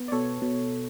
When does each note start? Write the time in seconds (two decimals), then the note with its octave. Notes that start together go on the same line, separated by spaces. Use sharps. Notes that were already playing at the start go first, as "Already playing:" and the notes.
Already playing: B3
0.08 D5
0.12 B2 A4 C#5
0.42 B2